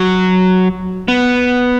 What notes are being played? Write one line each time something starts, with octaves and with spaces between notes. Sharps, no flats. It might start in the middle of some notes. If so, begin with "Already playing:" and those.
Already playing: F#3
B3